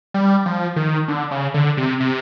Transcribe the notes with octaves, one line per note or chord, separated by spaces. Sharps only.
G3
F3
D#3
D3
C#3
D3
C3
C3